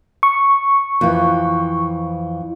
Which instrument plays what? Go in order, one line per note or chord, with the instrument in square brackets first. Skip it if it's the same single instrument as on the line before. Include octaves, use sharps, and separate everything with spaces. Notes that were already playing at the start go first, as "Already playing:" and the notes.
[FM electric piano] C#6
[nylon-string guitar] F2 E3